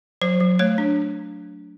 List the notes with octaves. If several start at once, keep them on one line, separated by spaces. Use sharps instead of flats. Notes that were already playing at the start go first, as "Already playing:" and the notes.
F#3 C5
F#3
A3 C#5
D4